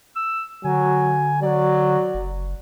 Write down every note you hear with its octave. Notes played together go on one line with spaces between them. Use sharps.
E6
D3 F#3 G#5
F#3 D5
F#1